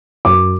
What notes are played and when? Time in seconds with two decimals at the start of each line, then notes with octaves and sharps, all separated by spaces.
0.25 F#2 D6